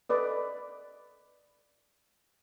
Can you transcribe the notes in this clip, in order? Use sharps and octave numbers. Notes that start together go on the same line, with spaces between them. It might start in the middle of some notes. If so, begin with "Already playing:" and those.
A4 B4 D5 D#5